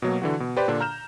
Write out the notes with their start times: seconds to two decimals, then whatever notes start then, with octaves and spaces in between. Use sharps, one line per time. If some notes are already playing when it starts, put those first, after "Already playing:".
0.02 B2 F#3 A#3
0.22 D3 E3 F#4
0.40 B2
0.57 G4 B4 C5 D5
0.68 A#2 D3 D4
0.81 A#5 F6 G6 E7